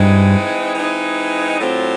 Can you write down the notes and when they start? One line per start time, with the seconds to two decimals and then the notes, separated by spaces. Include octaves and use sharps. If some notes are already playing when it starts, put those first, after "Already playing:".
Already playing: G2 E3 G#3 C4 D#4
0.75 E3 G#3 C4 D#4
1.59 A2 F#3 A3 C4 F4